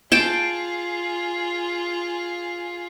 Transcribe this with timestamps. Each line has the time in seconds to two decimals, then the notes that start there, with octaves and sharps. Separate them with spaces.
0.12 F4 G#4 G5 A5